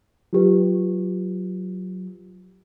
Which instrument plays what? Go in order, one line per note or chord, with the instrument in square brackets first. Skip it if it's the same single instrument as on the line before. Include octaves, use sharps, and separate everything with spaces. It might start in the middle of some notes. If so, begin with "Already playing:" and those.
[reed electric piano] F#3 [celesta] F4 G4 B4